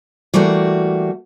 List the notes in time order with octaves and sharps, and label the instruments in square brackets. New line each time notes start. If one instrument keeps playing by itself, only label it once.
[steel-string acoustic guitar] E3 G3 A3 A#3 F#4